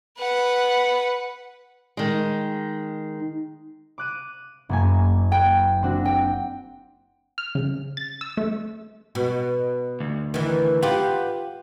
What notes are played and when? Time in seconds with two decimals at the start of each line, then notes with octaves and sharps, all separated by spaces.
0.18 B4 F#5
1.97 D#3 G#3
3.98 D6 F#6 D#7
4.69 F#1 A#3 G#5
5.32 G5
5.82 C4 D4 F#4
6.05 G5
7.38 F6
7.55 C#3
7.97 A6
8.21 E6
8.37 A3
9.15 B2
10.00 D2
10.34 D#3 E3
10.83 F4 G4 B4 F#5